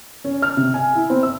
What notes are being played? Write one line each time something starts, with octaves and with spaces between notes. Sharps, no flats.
C#4
F6
C3
G#5
E4
C4
E6